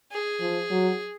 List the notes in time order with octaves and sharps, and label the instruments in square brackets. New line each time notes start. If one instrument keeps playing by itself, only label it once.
[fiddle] G#4
[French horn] F3
F#3